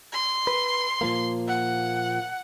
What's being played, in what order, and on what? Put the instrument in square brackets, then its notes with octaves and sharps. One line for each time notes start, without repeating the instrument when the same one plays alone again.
[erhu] C6
[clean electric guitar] B4
A#2 F3 A#3
[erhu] F#5